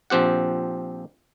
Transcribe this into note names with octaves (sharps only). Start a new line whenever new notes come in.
A#1 F3 C4 G4 F#5